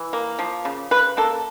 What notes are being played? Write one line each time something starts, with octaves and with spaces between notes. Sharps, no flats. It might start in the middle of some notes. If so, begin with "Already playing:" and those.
Already playing: E3
A#3
F3
C#3
C#3 B4
A#3 A4